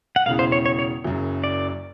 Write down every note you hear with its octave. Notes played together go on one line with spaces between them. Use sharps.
F#5
E1 E2 C#3 E3 F5
C5
C#5
C#5
C#5
F#1 F#2 C#3
D5